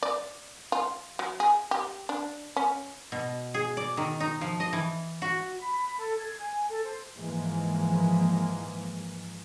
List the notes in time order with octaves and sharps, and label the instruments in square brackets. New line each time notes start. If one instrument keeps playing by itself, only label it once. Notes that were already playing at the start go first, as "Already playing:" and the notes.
[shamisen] D5
F4
F#3
G#4
G4
D4
C#4
[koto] B2
G#4
D5
D#3
D#4
F3
D#5
E3
F#4
[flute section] B5
B5
A4
G#6
G#5
A4
C5
[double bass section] G#2 E3 F3 G#3 A#3